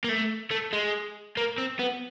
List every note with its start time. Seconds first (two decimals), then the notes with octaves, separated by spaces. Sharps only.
0.04 A#3
0.09 A3
0.51 A3
0.73 G#3
1.37 A#3
1.58 C4
1.79 B3